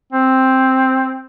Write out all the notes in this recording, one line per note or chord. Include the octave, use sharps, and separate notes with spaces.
C4